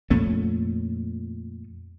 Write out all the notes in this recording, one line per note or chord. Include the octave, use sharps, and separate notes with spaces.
F2 A#2 A3 C#4